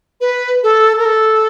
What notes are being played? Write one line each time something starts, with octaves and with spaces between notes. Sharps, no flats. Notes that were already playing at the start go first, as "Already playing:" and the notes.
B4
A4
A#4
A4